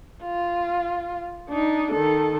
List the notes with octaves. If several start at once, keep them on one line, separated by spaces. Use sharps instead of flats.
F4
D4 D#4
D#3 A4